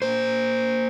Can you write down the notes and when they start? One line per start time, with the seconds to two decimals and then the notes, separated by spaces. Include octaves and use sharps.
0.02 A#3 C5